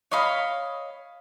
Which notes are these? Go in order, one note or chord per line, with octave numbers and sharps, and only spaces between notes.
C#5 D#5 F5 B5